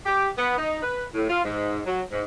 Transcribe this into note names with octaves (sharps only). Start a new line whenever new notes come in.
G4
B3
D#4
B4
A2
F4
G#2
F#3
G#2